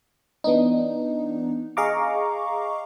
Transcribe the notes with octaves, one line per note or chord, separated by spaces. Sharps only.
E3 B3 D4 D#4
G#4 D#5 F5 A#5 C#6 D6